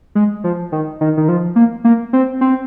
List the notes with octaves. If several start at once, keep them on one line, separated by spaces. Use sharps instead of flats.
G#3
F3
D#3
D#3
D#3
F3
A#3
A#3
C4
C4